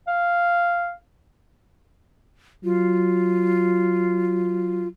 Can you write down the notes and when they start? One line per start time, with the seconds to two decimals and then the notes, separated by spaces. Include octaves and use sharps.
0.07 F5
2.64 F#3 F4